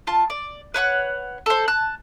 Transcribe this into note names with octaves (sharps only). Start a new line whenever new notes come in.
F4 A5
D5
B4 C#5 F#5 F#6
A4 C5
A5 F#6